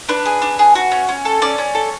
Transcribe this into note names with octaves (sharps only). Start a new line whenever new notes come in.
D4 B4
G#4
D4
G#4
F#4
C#4
C#4
A4
C#4 D5
C#4
A4